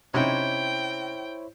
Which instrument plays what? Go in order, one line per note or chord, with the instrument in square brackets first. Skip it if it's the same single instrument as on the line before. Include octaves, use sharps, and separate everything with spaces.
[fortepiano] C3 C#4 D#4 [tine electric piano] E4 C5 C#5 [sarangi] G5